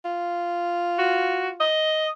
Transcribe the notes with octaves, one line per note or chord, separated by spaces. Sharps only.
F4
F#4
D#5